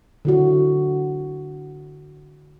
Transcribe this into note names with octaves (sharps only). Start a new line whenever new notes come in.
D3 E4 F#4